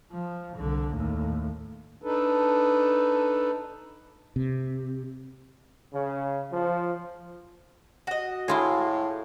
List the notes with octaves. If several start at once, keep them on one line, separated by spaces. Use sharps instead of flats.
F3
C2 D3
D#2 A2
D4 D#4 A4 B4
C3
C#3
F3
F#4 D#5
A2 E4 F4 G#4